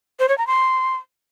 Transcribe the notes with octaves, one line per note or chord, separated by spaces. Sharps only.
C5
C#5
A#5
C6